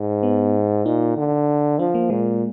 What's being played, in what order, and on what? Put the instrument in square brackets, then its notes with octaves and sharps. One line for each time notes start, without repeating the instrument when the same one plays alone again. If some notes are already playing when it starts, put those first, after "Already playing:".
Already playing: [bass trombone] G#2
[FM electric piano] B3
[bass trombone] A#2 [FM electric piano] D#4
[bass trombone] D3
[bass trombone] F3 [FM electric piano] D4
[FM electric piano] A#3
[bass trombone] A#2 [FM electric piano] G#3